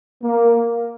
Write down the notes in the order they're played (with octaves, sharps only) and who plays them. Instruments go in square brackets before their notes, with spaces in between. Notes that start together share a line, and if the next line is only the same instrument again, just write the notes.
[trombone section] A#3